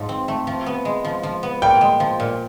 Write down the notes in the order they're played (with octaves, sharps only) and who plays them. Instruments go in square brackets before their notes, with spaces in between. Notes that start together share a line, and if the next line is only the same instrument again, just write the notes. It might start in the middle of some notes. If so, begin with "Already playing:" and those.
Already playing: [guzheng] G#2 F3
C4
A3
F3
B3
G#3
F3
F3
B3
[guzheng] A#2 [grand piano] G5
[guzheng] G#3
F3
A#2